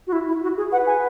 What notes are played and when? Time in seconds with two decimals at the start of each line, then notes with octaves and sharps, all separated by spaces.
0.07 F#4
0.13 E4
0.28 E4
0.43 F#4
0.57 G#4
0.72 B4 F#5
0.87 G#5